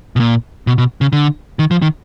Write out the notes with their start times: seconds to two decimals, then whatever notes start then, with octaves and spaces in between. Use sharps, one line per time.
0.16 B2
0.20 A#2
0.67 B2
0.78 B2
1.01 C#3
1.13 D3
1.59 D#3
1.71 F3
1.82 D#3